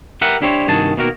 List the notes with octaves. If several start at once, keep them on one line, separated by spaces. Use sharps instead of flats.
G4 A#4 B4 E5 F#5
D4 E4 G4 C5 C#5
C2 G2 D#3 F#4 G#4 A5
B2 D#3 A#3 F#4 G4 A#4